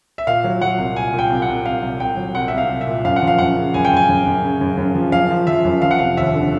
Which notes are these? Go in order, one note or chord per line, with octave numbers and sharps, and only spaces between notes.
E5
A#2 F5
F#3
F#3 F#5
C2
A#2 G#5
A#2
G5
C2
F#5
C2
C2 F5
C2
C2 G5
F#3
C2 F#5
E5
C2
F5
C2
E5
A#2
F#2 F5
F#5
F3
F5
F#2 F#5
C#3
F#2 G#5
G5
F#2
G#5
F#2
F#2
C#3
F#2
F#2
F3
F#2 F5
F3
F3 E5
F#2
F3 F5
F#5
F1 F5
D#2 E5
D3